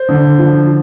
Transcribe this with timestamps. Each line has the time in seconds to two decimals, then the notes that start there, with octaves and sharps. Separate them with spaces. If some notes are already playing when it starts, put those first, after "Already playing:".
Already playing: C5
0.09 D3
0.39 F3